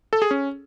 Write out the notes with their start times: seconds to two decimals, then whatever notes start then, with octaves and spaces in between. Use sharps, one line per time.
0.13 A4
0.22 G#4
0.31 C#4